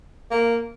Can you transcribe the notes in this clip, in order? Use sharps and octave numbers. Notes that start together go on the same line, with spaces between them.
A#3